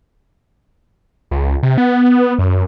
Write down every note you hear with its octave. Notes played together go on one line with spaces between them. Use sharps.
C#2
C3
B3
F#2